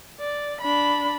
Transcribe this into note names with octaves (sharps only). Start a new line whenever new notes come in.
D5
D4 B5